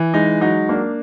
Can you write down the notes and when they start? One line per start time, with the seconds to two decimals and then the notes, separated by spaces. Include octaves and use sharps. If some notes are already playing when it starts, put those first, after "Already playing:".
Already playing: E3
0.14 G#3 D#4
0.41 F#3 D#4
0.69 A#3 D4